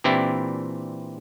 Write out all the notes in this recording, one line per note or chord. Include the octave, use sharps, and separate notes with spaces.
A#2 E3 C4 D4 E4 G4